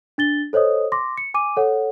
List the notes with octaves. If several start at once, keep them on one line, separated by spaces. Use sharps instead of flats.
D4 A6 G7
A4 C5 C#5 D#5 D#6
C6 D6 A#6
C#7
G#5 D6 D#7
A4 C#5 F#5